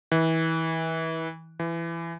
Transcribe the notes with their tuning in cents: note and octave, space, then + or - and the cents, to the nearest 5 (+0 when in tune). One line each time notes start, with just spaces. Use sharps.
E3 -25
E3 +20